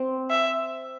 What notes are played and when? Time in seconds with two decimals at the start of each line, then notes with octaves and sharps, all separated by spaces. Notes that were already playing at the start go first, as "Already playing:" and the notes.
Already playing: C4
0.30 E5